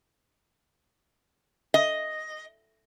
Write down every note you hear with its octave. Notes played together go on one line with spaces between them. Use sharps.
D#5